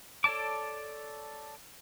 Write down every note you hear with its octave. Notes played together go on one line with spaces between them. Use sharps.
A4 C#5 D5 A5 D6